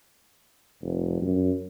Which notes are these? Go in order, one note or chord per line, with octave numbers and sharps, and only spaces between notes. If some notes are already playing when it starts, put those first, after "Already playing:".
F1
F#2